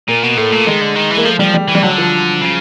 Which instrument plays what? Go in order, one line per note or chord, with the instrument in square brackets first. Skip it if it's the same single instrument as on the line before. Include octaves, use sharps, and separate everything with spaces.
[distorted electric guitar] A#2 [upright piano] A#3
[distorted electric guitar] B2
[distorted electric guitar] A2 [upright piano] A3
[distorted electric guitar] A#2
[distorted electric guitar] D#3 [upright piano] G#3
[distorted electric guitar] D3
D#3
E3
[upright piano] A#3
[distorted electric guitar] F3 [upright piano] A3
[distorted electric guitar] F3 [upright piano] G3
[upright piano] G3
[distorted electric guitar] E3
[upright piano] G3
[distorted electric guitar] D3 [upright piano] F#3
[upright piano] F3
[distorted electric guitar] C#3